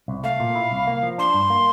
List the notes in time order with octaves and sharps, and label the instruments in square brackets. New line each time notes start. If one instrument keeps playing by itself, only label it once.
[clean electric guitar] C2
[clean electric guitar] A3 [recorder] F5
[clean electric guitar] A#2
E4
C2
A#3
F3
[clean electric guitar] D4 [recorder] C6
[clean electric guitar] G2
A#3